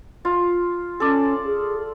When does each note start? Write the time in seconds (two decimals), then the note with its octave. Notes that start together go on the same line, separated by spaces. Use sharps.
0.25 F4
1.00 C#4 A4 D5
1.45 G#4